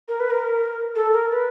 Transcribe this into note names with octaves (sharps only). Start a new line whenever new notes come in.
A#4
B4
A#4
A4
A#4
B4